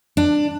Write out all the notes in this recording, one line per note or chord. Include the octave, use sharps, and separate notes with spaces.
D4